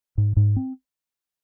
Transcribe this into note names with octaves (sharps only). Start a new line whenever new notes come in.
G#2
G#2
C4